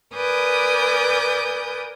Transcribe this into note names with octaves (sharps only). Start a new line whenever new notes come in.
A#4 B4 D5 G#5 D#6 G6